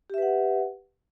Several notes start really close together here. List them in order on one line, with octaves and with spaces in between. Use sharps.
G4 E5 B4 F#5